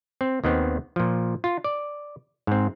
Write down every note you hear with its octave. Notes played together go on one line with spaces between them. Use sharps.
C4
D#2 D#3 B3 C4
A#2 F3
F4
D5
G#2 C4